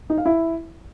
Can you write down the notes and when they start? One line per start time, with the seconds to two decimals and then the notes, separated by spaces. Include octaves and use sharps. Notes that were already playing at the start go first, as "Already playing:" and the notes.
0.10 D#4
0.18 F5
0.25 E4